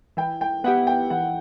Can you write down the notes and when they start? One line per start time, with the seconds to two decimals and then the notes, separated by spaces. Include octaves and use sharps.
0.17 E3 G5
0.41 G5
0.64 B3 E4 G4 F#5
0.87 G5
1.10 E3 F#5